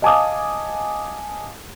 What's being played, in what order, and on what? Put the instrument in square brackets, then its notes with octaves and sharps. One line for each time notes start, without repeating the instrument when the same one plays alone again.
[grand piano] D#5 F5 G#5 A5 D6 D#6